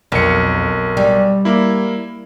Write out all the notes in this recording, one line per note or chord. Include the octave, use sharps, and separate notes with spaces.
B1 F2 A#4 C#7
G3
A#3 E4